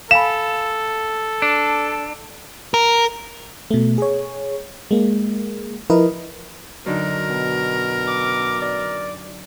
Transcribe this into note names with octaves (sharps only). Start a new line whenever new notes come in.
A4 F5 G#5 B5 E7
D4
A#4
B2 A3
G#4 C#5
G#3 A#3
F3 E4 A#4 B4 D#5
F#2 D3 D#4 A#4
B2
D6
D5